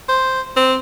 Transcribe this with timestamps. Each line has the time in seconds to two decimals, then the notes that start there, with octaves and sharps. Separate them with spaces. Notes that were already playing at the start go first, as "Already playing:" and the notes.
0.09 C5
0.57 C4